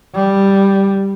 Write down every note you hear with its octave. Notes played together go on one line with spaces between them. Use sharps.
G3